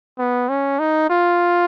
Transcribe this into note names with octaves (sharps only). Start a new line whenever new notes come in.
B3
C#4
D#4
F4